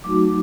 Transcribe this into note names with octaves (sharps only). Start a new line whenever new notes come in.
F#3 A3 D#4 F#4 D6